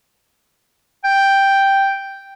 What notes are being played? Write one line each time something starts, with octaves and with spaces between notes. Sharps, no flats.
G5